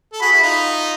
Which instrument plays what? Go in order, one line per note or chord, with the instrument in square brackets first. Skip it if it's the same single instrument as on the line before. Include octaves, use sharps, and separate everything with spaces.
[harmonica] A4
[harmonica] F#4 G#4 [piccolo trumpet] B5
[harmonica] E4 F#4
D#4 F4